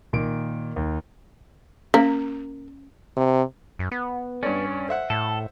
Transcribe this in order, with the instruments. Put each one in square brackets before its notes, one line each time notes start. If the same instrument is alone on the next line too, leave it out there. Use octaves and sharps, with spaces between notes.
[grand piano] A#2 D#3 D7
D#2
[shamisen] A#3 [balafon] C#4
[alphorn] C3
[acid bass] F#2
B3
[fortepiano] G2 C#5 D5 [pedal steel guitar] C#4
[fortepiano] C5 E5 F#5
[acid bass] A2 [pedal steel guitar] A4